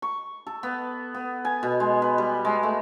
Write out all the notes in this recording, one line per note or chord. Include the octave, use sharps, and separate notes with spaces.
C#6
A4
B3
B3
G#5
B2
G#3
B4
G3
G#3
A3